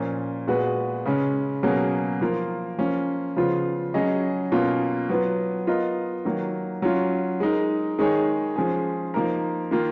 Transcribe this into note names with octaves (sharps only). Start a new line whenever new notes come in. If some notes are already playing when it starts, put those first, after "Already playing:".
Already playing: A#2 F3 A#3 C#4
A#2 G#3 B3 F#4 B4
C#3 G#3 C#4
B2 F#3 A#3 C#4 G#4
F3 A#3 F4 A#4
F3 A#3 C#4
C#3 F3 B3 F4
F#3 C#4 G#4 D#5
B2 A#3 C#4 F4
F#3 B3 F4 B4
B3 F4 A#4 D#5
D#3 F#3 A#3
F#3 C#4 F4
G#3 D#4 A#4
D#3 G#3 D#4 G#4 C#5
F3 G#3 C#4 G#4
F3 A#3 D#4 A#4
D#3 A#3 F4